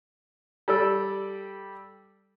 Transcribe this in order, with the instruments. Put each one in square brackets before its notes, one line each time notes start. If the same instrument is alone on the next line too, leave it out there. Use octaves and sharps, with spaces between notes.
[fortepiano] G3 A4 D5 E6